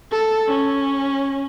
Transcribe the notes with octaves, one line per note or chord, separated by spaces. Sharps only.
A4
C#4